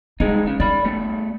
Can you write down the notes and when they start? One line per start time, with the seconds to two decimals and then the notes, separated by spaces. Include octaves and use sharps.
0.20 G2 G#3 D4 D#4
0.47 C#3
0.60 D#4 D5 B5
0.85 G3 A3